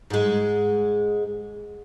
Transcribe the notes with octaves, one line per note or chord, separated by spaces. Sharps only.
G#2 G#3